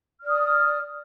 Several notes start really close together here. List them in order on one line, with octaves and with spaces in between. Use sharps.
F6 D5 D#6